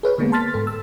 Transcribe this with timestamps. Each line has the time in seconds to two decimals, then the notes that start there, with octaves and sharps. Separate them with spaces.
0.03 G#4 B4 C#5
0.18 D3 G#3 A#3 B3
0.32 A5 C6 F6 A6 B6
0.54 G#2 A4
0.67 E6